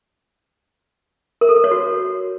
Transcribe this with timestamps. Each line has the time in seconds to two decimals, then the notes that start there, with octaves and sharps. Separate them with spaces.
1.41 A#4
1.49 A4
1.56 A#4
1.64 C#5
1.71 F#4